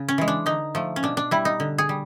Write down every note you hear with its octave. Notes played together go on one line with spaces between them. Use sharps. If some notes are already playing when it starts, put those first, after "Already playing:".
Already playing: C#3
C#4
E3 G#3
D4
D3 D#4
F3 A3
C#4
B2 D4
D4
G3 E4
D#4
D3
G#4
G3